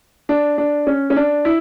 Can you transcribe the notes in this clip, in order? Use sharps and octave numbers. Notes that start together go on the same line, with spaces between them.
D4
D4
C#4
C#4
D4
E4